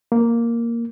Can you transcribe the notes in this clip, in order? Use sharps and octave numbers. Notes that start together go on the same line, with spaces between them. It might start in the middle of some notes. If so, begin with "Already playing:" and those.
A#3